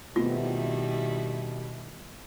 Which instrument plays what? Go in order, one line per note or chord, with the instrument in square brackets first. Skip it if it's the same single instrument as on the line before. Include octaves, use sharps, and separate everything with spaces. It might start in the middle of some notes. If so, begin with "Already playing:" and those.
[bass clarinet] B2 [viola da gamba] D#3 G3 E4 [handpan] A3 B3 C4 [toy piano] F4